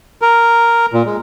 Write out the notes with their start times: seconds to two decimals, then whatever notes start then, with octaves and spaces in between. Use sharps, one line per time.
0.22 A#4
0.93 A#2
1.06 G#3